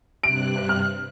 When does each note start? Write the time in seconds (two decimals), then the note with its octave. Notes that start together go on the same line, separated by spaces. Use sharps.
0.23 G2 C3 F#6 D7
0.69 F6